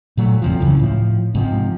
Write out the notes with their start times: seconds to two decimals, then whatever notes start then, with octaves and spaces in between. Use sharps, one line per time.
0.17 A#2 F#3 A3
0.42 E2 C3 F3
0.60 C#2 F#2 C#3 E3
0.79 A2 F3
1.35 G#2 C3 F3